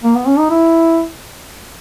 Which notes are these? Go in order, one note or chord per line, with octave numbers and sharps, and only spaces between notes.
A#3
B3
C#4
D#4
E4